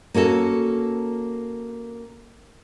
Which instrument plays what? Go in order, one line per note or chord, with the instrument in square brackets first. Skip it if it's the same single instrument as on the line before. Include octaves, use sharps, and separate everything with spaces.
[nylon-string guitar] A#3 C#4 F#4 A4